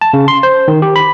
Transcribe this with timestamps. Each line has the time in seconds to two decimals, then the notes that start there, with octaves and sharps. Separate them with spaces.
0.01 A5
0.13 C#3
0.28 C6
0.43 C5
0.68 D#3
0.82 G4
0.96 B5